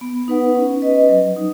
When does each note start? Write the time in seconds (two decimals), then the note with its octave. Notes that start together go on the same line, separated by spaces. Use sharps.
0.01 B3
0.28 D#4 B4 F#5
0.55 C#4
0.82 B4 D#5
1.09 F#3
1.36 D#4